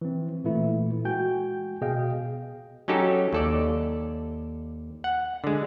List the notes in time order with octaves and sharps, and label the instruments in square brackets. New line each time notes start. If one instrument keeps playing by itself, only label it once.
[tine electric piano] E3 C4
A#2 E3 A3 E4
G#3 F#4 G5 G#5 G6
B2 G#4 D#5 F5 G5
[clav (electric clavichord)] F#3 C#4 D#4 G4 A4
D#2 A4 D5
F#5
D3 G#3